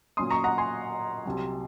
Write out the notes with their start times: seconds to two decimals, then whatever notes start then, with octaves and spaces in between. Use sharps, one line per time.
0.17 A#2 F#3 C#4 C6 D#6
0.31 A#5 C#6
0.44 F#5 A#5
0.58 G#5 C6
1.25 C2 C3 F#3